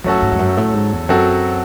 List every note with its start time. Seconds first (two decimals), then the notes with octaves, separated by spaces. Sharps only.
0.04 F#2 F#3 A3 C#4 F#4 A4
0.22 G#2
0.32 E2
0.39 F#2
0.57 A2
0.74 G#2
0.92 E2
1.09 F#2 F#3 C4 F#4 A4